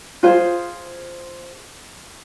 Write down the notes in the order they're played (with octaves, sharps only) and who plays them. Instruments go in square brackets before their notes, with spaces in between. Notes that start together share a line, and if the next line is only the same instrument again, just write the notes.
[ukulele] F4 G#4 C5